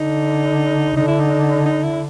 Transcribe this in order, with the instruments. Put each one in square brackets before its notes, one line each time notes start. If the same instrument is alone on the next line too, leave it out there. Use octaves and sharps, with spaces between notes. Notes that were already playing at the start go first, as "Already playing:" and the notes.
Already playing: [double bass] D3 [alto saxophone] D#4
[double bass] D3 [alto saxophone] D#4
[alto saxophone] E4
D#4
D#4
E4